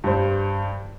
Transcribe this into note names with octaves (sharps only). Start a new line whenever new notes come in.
G2 C5